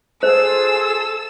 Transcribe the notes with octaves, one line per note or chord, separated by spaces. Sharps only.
F4 G#4 A4 C5 E6